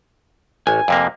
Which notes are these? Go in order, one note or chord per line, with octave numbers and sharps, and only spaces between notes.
A1 G#5
F2 C3 A#3